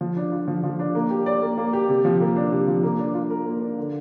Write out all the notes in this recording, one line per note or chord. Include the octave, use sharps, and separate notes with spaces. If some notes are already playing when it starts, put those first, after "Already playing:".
F3
D4
F4
F3
F3
D4
A#3
G4
D5
A#3
A#3
G4
C3
F3
A#3
D4
C3
F3
A#3
D4
F4
A#4
A#3
D4
D3